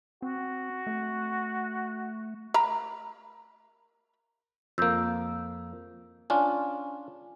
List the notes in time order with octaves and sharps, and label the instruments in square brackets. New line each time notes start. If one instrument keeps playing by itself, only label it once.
[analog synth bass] C4 [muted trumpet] F#4
[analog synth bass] A3
[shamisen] A#4 A#5 B5
[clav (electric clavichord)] F2 A#3 [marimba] E6 G6
[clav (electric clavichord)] C#4 D4 F4 [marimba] G#5